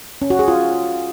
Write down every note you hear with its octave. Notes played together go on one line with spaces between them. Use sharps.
C#4
F#4
G#4
F4